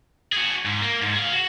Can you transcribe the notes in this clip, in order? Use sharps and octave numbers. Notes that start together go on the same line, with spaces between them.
F#4 G#4
G#2
A#3
G#2
G#4 F5
F#4